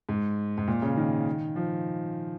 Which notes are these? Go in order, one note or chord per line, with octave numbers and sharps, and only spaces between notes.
G#2
G#2
A#2
C#3
D#3
F3